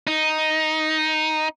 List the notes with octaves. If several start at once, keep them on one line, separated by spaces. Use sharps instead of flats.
D#4